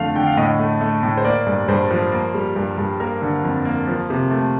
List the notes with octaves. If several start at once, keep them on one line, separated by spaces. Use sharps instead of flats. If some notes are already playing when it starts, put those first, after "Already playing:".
Already playing: F2 D3 A3 F5
D3 G5
F5
A2 D#5
A3
A3
A2
C5
A#3 D5
G2
G2 C5
F3
A#3
G3
G2
G2
A#3 A#4
D3
F2
A#3
F3
C3
A3